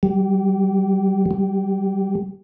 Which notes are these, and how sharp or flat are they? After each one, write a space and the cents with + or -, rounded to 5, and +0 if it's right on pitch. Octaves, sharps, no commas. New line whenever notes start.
G3 -20
G3 -15